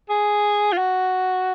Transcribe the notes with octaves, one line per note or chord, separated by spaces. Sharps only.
G#4
F4
F#4